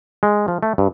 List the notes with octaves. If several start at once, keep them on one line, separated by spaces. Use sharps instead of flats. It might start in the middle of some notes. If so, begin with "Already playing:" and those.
G#3
F3
A3
G2